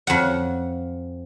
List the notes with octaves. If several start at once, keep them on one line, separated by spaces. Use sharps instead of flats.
F2 F#5